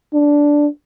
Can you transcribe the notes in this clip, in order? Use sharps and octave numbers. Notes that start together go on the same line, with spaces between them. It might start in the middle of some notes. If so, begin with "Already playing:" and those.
D4